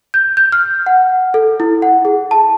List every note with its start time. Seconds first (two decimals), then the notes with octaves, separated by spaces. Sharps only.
0.14 G6
0.37 G6
0.52 F6
0.86 F#5
1.34 A4
1.60 E4
1.82 F#5
2.05 G#4
2.31 A5